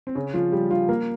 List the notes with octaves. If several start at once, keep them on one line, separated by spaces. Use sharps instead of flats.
C4
C#3 C#4
F3 F4
G3 G4
F3 F4
A#3 A#4